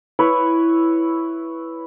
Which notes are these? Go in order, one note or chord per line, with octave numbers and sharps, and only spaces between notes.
E4 B4 C#5